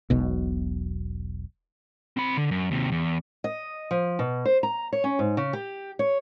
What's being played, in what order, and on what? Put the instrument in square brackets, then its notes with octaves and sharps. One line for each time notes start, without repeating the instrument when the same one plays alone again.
[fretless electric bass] E1 B1 B2
[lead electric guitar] C4 B5
D3
F#2
D#2 C3
E2
[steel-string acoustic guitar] D#5
F3
B2
C5
A#5
C#5
C#4
G#2
C#3
G4
C#5